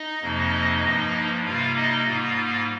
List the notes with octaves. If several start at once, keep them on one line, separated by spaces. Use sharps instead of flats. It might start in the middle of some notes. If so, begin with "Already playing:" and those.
Already playing: D#4 D#5
F2 C3 F3 A#3
G2 F3 A#3
C3 G3 A#3 F4 F5
D#4 D#5
G#2 G3 A#3 F4 F5